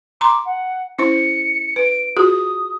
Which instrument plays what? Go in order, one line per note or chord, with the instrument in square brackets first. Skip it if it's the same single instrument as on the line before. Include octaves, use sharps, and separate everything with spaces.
[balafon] A#5 C6 [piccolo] D6
[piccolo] F#5
[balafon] C#4 E4 C5 [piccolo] C#7
[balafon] B4 [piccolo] D7
[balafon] F4 F#4 G#4 [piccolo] D#6